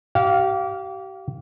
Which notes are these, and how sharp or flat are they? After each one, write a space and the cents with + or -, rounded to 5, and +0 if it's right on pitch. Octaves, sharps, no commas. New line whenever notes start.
G4 -35 F5 +0